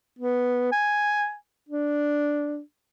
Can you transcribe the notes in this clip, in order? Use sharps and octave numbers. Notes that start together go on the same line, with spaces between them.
B3
G#5
D4